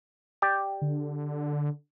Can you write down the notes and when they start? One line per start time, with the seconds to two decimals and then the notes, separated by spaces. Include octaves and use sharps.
0.42 G4 D5 G5
0.82 D3